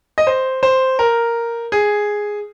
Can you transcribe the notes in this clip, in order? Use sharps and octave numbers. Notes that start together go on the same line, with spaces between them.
D#5
C5
C5
A#4
G#4